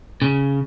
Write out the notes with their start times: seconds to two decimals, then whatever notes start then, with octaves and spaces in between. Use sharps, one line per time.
0.22 C#3